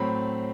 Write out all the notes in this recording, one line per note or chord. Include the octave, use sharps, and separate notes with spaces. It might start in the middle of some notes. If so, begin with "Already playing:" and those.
Already playing: A2 F#3 C4 B5